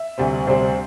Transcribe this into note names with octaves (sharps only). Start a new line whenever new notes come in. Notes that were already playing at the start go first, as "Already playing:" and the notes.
Already playing: E5
D2 C3 G3 C4
D2 C3 G3 C4 C5